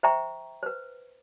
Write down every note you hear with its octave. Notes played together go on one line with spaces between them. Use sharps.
C5 E5 G5 A#5 C#6
B4 C5